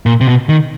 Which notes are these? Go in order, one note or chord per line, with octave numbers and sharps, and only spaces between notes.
A#2
C3
B2
D#3